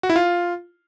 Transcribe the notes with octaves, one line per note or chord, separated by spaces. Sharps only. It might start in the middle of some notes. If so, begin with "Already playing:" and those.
F#4
E4
F4